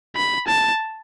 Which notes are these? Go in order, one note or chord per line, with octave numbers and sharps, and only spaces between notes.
B5
A5